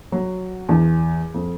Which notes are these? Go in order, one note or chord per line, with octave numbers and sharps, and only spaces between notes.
F#3
E2
F2